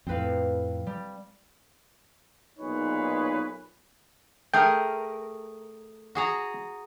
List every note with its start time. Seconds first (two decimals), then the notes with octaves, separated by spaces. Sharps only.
0.07 F2 A2 C4 B4 F5
0.87 G3
2.59 B1 A#2 D#4 G#4 B4 C#5
4.54 A3 G#4 A#4 G5
6.15 F#4 G#4 A#5